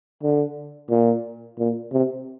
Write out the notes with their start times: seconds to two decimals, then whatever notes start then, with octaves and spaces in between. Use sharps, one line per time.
0.23 D3
0.90 A#2
1.59 A#2
1.93 C3